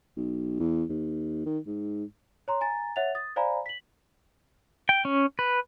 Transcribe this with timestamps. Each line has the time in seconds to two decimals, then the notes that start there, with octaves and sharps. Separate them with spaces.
0.17 B1
0.60 E2
0.89 D#2
1.46 D#3
1.67 G#2
2.48 C#5 A#5 C6
2.61 G#5 A#5 A6
2.96 C#5 E5 F#5 A6 F7
3.15 D#6 A6
3.36 C5 D5 F5 G#5 A#5 B5
3.66 B6 F#7
4.89 G5
5.05 C#4
5.39 B4